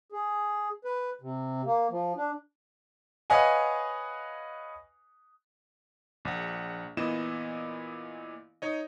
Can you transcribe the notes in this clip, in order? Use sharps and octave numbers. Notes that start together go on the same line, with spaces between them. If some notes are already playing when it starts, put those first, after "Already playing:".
G#4
B4
C3
A#3
F3
D4
B4 C#5 D#5 F5 F#5 G#5
A#1 F#5
A#2 E3 B3 E4 D#5 E7
D#4 C#5 D#5